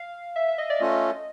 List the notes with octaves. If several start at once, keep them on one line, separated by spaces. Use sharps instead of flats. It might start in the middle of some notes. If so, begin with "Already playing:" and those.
Already playing: F5
E5
E5
D#5
D5
A3 C#4 F4 A4 D#5